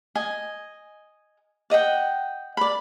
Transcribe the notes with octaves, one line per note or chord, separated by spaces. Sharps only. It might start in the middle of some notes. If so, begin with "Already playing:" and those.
D#5 G#5
D5 D#5 F#5 G5
D5 B5